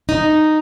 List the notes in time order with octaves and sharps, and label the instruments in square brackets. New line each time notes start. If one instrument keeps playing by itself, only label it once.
[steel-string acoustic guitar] D#4